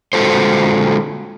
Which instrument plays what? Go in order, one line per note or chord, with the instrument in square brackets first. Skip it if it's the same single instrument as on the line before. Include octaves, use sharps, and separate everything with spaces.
[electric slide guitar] D3 G#3 F4 F#4 A4 C5